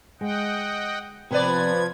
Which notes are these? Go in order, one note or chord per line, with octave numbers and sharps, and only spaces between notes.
G#3 D#5 F#5 G5
C3 F3 B3 B4 D5 G#6